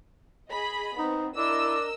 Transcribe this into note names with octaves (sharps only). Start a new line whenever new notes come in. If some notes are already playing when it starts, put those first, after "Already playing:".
G#4 D#5 B5
B3 C4 D#4
D4 E4 A#4 D#5 E6